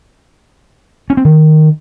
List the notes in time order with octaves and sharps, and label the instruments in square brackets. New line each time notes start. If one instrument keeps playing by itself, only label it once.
[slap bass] C#4
C4
D#3